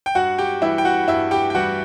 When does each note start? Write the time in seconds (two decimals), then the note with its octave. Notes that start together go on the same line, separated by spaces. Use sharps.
0.06 G5
0.15 G2 F#4 F#5
0.38 G4 G5
0.62 E3 G3 E4 E5
0.78 G5
0.85 F#4 F#5
1.08 G2 E4 E5
1.31 G4 G5
1.50 G5
1.55 E3 G3 F#4 F#5